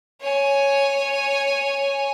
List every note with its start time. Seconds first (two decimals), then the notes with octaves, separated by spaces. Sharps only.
0.22 C#5 G#5